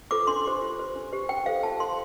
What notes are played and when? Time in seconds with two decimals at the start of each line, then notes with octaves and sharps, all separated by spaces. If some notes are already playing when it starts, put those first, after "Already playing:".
0.11 F4 A4 C5 D6
0.27 D4 C6
0.46 G4 C5
0.62 F4
0.79 C5
0.96 D4
1.12 G4 C5
1.29 D4 G5
1.46 A4 C5 F5
1.63 F4 A5
1.80 A4 C5 C6